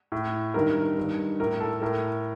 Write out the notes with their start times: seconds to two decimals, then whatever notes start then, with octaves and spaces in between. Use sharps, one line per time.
0.12 A2
0.54 G2 D#3 A#4
0.97 G2 D#3
1.40 A2 A#4
1.60 A4
1.82 A2 A#4